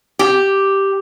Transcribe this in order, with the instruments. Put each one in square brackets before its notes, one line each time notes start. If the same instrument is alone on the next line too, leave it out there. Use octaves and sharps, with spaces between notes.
[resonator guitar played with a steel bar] G4